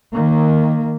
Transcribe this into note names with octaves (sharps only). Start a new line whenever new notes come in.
D#3 A#3